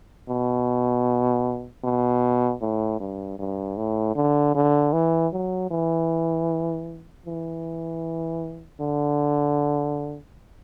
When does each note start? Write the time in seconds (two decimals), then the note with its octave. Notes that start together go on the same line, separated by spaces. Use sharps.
0.29 B2
1.84 B2
2.61 A2
3.00 G2
3.39 G2
3.77 A2
4.16 D3
4.55 D3
4.93 E3
5.33 F#3
5.71 E3
7.26 E3
8.80 D3